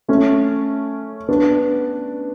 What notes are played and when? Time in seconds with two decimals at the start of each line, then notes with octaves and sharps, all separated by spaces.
0.08 A3 C#4
1.29 B3 D4